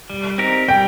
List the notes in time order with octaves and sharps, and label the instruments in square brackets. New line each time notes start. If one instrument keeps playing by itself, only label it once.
[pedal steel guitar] G3
C4 D#4 G4 A#4
[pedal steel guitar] G3 [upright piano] G5